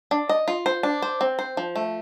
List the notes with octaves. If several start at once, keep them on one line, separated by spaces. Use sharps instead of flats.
D4
D#5
F4
C5
D4
C5
C4
C5
F3
A3